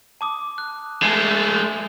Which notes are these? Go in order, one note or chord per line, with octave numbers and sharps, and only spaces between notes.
A5 D6 D#6
F#6
G#3 A3 G#5 G#6 C7